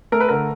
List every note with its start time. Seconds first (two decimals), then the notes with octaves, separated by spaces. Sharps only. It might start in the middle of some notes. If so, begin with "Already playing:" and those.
0.12 A3 A#4
0.20 B4
0.29 D3 A#4